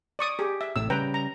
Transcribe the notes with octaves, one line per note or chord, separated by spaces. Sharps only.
D5 C#6 D#6
G4 G#4
E5
A1 A2 C3 E6
C#3 G3 B4 G5 A#5
A#5